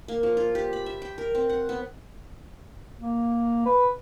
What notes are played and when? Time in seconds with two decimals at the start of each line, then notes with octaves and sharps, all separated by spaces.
0.08 A#3
0.23 F3
0.37 F4
0.55 G4
0.73 B5
0.86 E5
1.02 G5
1.18 A#4
1.35 C4
1.49 F#5
1.69 B3
3.00 A#3
3.66 B4